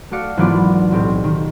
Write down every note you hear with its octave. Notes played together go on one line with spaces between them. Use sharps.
A3 F#4 D5 F5 C#7
G#1 E3 F#3 B3 F4 D5
B1 A2 C4 G4
D#3